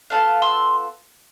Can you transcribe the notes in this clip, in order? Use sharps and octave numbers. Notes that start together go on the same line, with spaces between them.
B3 F4 A4 F5 A5
C6 E6